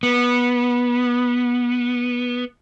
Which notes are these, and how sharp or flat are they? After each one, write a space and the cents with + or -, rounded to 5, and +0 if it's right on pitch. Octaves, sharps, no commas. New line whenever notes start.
B3 -15